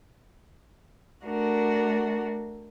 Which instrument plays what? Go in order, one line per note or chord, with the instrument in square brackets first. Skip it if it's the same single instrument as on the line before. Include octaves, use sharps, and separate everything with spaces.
[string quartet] A3 D4 F#4 A#4